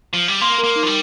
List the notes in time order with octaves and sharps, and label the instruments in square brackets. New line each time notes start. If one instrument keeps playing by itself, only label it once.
[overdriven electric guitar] F3
G3
[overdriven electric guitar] A#3 [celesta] C6
[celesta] A#4
[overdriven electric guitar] A#3
[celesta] D#4
[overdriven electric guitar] F3
G3